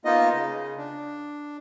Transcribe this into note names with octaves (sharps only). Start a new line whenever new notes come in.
A#3 B3 D#4 F4 D#5
C#3
D4